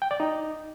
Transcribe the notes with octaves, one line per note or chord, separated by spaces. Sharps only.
G5
D5
D#4